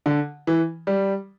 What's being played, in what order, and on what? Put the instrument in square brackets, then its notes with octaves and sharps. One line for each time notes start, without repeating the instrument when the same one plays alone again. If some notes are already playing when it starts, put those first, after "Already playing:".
[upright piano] D3
E3
G3